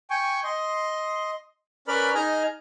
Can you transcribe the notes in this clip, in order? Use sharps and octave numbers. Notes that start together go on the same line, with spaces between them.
G5 G#5 C#6
D#5 C6
C#4 A#4 B4 D5 B5 F6
D#4 G#4 D#5 G#5 A#5 F6